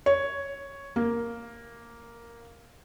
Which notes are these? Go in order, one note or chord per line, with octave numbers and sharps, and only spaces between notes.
C#5
A#3